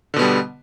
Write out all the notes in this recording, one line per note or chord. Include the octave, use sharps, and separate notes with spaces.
B2 D3 G3 B3